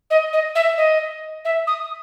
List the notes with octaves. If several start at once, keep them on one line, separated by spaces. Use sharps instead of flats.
D#5
D#5
E5
D#5
E5
D#6